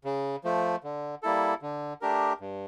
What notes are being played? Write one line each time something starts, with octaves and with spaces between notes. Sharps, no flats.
C#3
F3 A3
D3
G3 A#3 E4 A4
D3
A3 D4 G4 A#4
G2